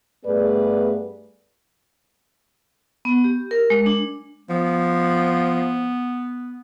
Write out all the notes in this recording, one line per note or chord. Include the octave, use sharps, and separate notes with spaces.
G2 A3 B3 G#4 B4 D5
B3
G4
A#4
G#3
D4
F3 B3